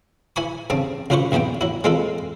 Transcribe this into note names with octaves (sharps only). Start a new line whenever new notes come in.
E3 G#5 B5 C#6
G2 C#3 C4 A5
C#2 F#2 F4 B4 C5 C#6
B1 E2 E3 B3 G5
F#3 E4
G#3 C4 F4 A4 B4